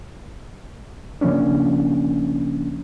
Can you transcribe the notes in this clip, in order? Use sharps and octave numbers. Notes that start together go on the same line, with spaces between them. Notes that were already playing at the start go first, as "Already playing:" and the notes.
C#3 F3 A#3 C#4 D4